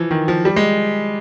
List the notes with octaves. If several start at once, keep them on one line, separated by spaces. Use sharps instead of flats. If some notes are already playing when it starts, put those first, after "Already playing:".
Already playing: E3 F3
D#3
F3
G3
G#3